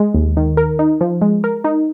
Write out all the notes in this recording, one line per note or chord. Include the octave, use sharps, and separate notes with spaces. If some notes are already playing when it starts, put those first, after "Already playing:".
Already playing: G#3
D#2
D#3
A#4
D#4
F3
G#3
A#4
D#4